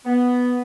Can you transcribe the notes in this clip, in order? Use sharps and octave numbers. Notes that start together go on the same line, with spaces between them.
B3